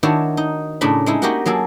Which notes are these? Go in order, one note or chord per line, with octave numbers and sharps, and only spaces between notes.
D#3 D4 E4 F#4 C#5
D#4
A2 C#3 D4 A#5 B5
G#3 D#4 E4
A#3 D#4 F#4 G4 A#4 F#5
F#3 A#3 G#4 A4